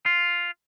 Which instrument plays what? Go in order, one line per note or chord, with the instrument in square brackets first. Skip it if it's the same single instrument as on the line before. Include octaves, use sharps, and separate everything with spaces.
[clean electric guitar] F4